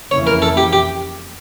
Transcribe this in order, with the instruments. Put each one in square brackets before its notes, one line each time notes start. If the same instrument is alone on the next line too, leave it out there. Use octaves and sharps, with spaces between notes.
[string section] F2 C#3 E3 A#3 E4 [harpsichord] C#5
[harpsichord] A#4
A4
G4
G4